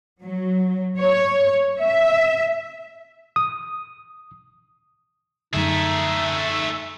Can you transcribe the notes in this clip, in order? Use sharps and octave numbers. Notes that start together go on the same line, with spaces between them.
F#3
C#5
E5
D#6
F#2 D3 A3 D#4 G#4 E5